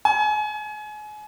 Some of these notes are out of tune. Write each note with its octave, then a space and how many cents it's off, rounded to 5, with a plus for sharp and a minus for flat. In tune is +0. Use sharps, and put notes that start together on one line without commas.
G#5 +30